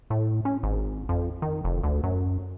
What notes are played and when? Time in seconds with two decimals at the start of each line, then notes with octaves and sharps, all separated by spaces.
0.10 A2
0.45 C#4
0.63 G#1
1.09 F2
1.42 D#3
1.64 F1
1.83 D2
2.04 F#2